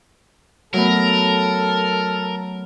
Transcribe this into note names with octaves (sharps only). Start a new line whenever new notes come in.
F#3 A3 B3 A4 A#4